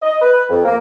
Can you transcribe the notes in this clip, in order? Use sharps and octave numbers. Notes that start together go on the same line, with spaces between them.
D#5
B4
F2
A#3